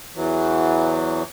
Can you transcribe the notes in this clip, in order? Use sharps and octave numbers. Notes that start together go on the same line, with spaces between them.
E2 E3 F#3